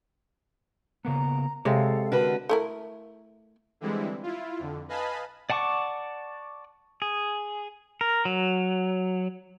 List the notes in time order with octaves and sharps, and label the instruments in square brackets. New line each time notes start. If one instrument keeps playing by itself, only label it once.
[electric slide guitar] C#3 A#3 B3 [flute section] A#5
[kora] C3 G#3 [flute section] A4 F5 [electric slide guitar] C#5
[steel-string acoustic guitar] D3 F#4 B4 [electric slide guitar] A#4
[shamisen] A3 E4 A#4
[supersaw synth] D3 E3 G3 G#3 C4 E4
E4 F4
F2 D3
B4 D#5 F5 G#5 A5 B5
[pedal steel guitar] D5 F#5 A5 C#6 D6
G#4
A#4
F#3